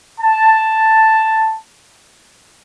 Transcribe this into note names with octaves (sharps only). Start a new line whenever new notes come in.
A5